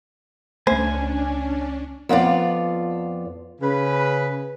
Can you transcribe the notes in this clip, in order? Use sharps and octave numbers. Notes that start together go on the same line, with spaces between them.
C#2 A3 C#4 D4 C5 G#5
F2 B3 F4 D5
C#3 B4